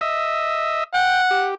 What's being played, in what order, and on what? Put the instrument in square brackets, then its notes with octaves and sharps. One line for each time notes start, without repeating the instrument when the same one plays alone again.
[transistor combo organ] D#5 E5
[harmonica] F#5 [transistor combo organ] G5
[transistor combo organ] G4